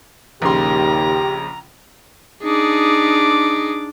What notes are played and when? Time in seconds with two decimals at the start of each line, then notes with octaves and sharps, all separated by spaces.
0.42 A#1 D#2 C#3 G4 A#5 C6
2.44 D4 D#4 G#4 D6